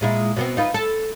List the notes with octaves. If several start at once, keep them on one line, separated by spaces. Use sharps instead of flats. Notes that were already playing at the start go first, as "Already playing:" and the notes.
A#2 G#3 E4
B2 B3 C4
D#4 F4 B4
A4